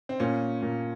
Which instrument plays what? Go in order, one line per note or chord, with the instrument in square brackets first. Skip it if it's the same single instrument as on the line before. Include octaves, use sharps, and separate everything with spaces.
[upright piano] C4
[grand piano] A#2 [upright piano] C#4
[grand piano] A#2